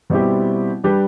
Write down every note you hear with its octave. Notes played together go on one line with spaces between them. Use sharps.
B2 G3 C4 E4 G4
G3 D4 G4 B4